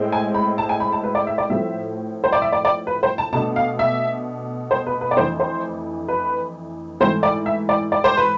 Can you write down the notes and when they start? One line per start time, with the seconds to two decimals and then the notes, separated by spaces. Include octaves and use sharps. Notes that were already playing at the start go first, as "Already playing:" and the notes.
Already playing: A2 G#3 C4
0.12 G#5
0.34 B5
0.58 A5
0.69 G#5
0.80 B5
0.92 A5
1.03 B4
1.15 D5
1.27 E5
1.38 D5
1.50 A2 F3 A3 C4 E5
2.24 C5
2.32 D5
2.42 E5
2.53 D5
2.65 D5
2.87 B4
3.03 C5
3.18 A5
3.33 B2 A3 D4 A5
3.56 F5
3.79 E5
4.71 C5
4.87 B4
5.01 B4
5.11 D5
5.16 F2 E3 A3 D4 C5
5.40 C5
6.08 B4
7.00 G#2 E3 A3 C5
7.23 D5
7.46 E5
7.69 D5
7.92 D5
8.04 C5
8.17 B4